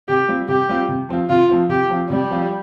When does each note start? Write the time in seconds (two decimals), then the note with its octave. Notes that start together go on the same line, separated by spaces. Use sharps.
0.09 C3 G4
0.28 G3 C4 F4
0.48 C3 G4
0.69 G3 C4 F4
0.89 C3
1.09 F3 C4 F4
1.29 C3 F4
1.49 F3 C4 F4
1.69 C3 G4
1.89 F3 C4 F4
2.10 C3 G3
2.30 F3 C4 F4